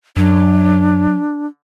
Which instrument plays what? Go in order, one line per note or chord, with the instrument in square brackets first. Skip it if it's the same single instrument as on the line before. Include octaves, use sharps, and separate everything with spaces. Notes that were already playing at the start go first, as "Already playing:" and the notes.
[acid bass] F#2 [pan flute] F#3 [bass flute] D4